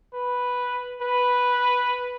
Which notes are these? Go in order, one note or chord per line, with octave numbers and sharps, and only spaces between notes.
B4
B4